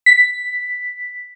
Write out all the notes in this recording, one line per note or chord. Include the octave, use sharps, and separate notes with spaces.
B6